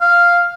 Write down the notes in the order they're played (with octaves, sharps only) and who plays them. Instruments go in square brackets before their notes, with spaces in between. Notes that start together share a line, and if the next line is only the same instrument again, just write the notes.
[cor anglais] F5